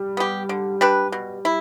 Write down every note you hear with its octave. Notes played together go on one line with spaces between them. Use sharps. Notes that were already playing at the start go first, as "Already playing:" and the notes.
Already playing: G3
B3 G4
D3
G3 D4 B4
B2
E4